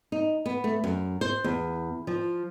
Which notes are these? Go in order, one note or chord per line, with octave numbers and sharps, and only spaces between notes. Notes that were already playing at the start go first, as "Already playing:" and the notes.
D#4
B3
A3
F#2
C5
E2
F3